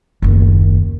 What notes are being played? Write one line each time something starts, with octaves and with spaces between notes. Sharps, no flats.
F#1 D#2